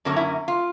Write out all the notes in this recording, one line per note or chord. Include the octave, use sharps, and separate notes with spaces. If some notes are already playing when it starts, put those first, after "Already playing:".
F#2 D3 F#3 A#3 C#4 A#4
E4
F4